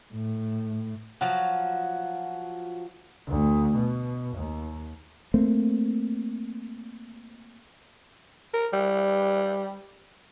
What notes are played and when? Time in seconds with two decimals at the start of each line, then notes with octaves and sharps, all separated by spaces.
0.14 A2
1.21 F3 F#3
3.28 D2
3.77 B2
4.36 D#2
5.34 A3 A#3 C4
8.54 A#4
8.73 G3